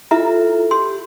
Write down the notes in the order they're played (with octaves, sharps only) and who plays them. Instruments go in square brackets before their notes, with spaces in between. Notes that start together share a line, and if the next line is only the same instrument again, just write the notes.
[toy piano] E4 E5 A#5 [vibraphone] F4 A4
[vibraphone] G4 [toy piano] C6